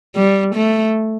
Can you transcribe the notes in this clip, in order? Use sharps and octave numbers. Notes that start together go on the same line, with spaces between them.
G3
A3